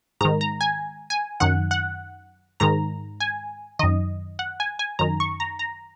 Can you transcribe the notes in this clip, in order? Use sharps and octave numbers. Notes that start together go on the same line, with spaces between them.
G#2 D#3 A#5
A#5
G#5
G#5
F#2 D#3 F#5
F#5
G#2 D#3 A#5
G#5
F#2 D#3 D#5
F#5
G#5
G#5
F#2 D#3 A#5
C#6
A#5
A#5